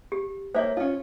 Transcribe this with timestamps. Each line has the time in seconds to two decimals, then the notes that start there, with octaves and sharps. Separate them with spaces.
0.12 G4
0.55 A#3 C5 C#5 E5
0.77 C#4 F4